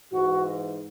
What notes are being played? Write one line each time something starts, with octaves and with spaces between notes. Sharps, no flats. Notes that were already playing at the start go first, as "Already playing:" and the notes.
G#2 E3 F#4